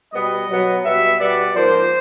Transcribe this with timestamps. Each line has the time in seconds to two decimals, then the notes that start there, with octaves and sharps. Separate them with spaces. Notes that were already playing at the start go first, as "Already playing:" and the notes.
0.12 B2 G3 B3 D#5
0.49 B2 F#3 B3
0.83 B2 G3 B3 E5
1.19 B2 G3 B3 D5
1.54 G#2 F3 A#3 C5